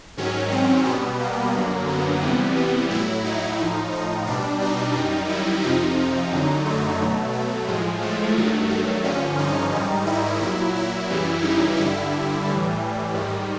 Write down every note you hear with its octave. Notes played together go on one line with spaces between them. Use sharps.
G#2 D#3 F#3 C#4
C4
B2 G3 B3
A#3
F#2 D3 F#3
B3
E2 C3 E3 G3
B3
A2 F#3 E4
D#4
A2 F3
D#4
B2 G3 D4
D#4
F#2 D#3 G3
E4
F2 C3 F3 D#4
F#2 D3 F#3
A3
B2 F#3
A3
A2 F3 G#3
A3
G2 D#3 F#3
A3
G2 D3 F3 C#4
D#4
G#2 D#3 G3
E4
A#2 F#3 E4
E4
F#2 C#3 E3 G3
D#4
G2 D3 G3 E4
A2 E3 G3
G#2 D#3 G3